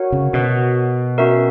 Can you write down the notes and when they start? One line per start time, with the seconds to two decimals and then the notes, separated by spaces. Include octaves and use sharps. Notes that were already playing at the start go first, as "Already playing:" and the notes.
Already playing: F#4 A#4 C#5 F#5
0.12 C#3
0.33 B2
1.18 C#4 F#4 A#4 E5